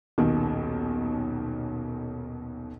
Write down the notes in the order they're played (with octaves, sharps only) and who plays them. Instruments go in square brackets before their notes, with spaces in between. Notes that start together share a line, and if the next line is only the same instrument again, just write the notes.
[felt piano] D#1 B1 B2 D#3